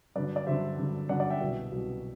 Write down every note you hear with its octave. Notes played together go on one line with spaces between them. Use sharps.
G2 D3 F#3 B4 D5
D5
G2 D3 F#3 C5 E5
G2 D3 F#3
G2 D3 F#3 D5 F#5
D5 F#5
E5 G5
C2 B2 F#3
C2 B2 F#3